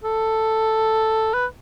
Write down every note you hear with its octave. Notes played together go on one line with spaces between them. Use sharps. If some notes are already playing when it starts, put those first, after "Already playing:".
A4
B4